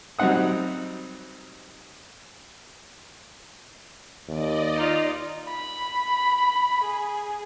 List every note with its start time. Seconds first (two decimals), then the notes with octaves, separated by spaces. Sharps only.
0.19 F#3 G3 C4 D#4 F#5 D#6
4.28 D#2 D5 D#5
4.75 D#4 F4
5.48 B5
6.84 G#4